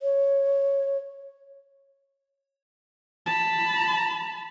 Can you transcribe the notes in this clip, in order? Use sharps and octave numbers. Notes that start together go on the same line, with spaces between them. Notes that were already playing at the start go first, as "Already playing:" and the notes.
C#5
A5 B5